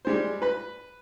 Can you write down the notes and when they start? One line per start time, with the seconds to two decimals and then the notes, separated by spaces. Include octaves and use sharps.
0.05 G3 G#3 C5
0.42 B4 B5